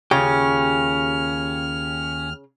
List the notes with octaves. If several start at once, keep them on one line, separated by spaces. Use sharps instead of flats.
D#2 C#3 C#4 F4 G4 F6